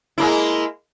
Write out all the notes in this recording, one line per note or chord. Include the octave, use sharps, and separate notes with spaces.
G#3 A#3 E4